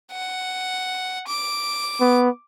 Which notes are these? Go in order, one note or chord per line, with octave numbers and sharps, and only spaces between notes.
F#5
D6
B3